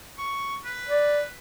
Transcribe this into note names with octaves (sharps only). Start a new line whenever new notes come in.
C#6
B4
D5